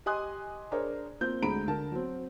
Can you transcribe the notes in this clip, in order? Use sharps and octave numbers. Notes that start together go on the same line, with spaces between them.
G4 D#5 G#5 C6 D#6 F#6
D4 G#4 A#4 C5 C#5
A#3 C4 F4 G6
D2 D3 G#3 A#5 B5 D7
D3 A#4 A5
F#3 C4